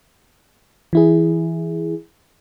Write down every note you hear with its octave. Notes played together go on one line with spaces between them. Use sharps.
E3 E4 G#4